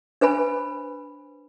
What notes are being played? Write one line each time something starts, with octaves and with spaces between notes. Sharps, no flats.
D4 B4 C5 G#5 B5